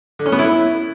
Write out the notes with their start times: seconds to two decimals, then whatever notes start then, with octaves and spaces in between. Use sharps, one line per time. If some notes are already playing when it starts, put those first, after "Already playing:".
0.19 D3
0.26 C#4
0.32 B3
0.39 E4